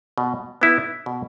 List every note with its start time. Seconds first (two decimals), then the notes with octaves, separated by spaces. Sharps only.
0.18 B2
0.61 B3 E4
1.06 B2